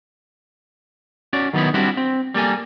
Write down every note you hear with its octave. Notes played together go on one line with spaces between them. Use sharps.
C#4 F#4 D5
D#3 F#3 B3 D#4 E4
G3 C4 D4 E4 F#4
C4
G3 A#3 A4 G#5